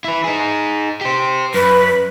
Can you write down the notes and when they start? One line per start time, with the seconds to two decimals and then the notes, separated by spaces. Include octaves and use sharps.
0.04 E4 B4
0.24 D#4 G#4
1.01 G4 C5
1.54 F#2 B4